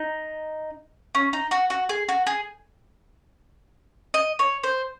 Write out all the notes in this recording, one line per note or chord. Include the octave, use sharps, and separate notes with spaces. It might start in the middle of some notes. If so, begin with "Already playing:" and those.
Already playing: D#4
C#4
D#4
F#4
F#4
G#4
F#4
G#4
D#5
C#5
C5